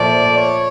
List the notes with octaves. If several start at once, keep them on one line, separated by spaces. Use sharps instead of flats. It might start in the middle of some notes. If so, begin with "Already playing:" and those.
Already playing: A#2 F3 A3 D5
C#5